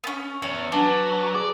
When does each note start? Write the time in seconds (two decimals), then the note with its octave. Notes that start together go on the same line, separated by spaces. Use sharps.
0.04 B3 C#4
0.42 E2 C#5
0.72 F#3 D4 F#4 B4 G#5
1.35 G#4 D5 D6